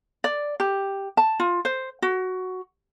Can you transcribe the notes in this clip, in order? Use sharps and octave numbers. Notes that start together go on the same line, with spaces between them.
D5
G4
A5
F4
C5
F#4